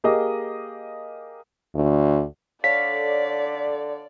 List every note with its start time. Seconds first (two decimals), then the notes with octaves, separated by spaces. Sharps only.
0.04 A#3 G4 G#4 A#4 D#5 D6
1.75 D2
2.64 D3 A4 C#5 D5 F5 B6